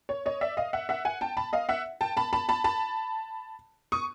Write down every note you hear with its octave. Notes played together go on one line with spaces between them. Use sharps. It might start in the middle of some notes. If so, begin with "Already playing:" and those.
C#5
C#5 D#5
D5 E5
D#5 F5
E5 F#5
E5 F#5
F#5 G#5
G5 A5
A5 B5
D#5 F5
E5 F#5
G5 A5
A5 B5
A5 B5
A5 B5
A5 B5
C#6 D#6